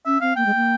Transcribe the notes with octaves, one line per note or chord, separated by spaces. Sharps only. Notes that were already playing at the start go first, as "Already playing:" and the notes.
C#4 E5
C4 F5
A#3 G5
G#3
A#3